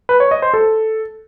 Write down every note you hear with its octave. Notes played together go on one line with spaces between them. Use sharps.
B4
C#5
D#5
C5
A4